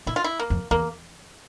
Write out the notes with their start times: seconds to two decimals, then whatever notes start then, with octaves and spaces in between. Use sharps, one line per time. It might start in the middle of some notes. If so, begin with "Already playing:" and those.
0.07 A#2 E4
0.16 F4
0.24 E4
0.39 A#3
0.50 F2
0.71 E2 A#3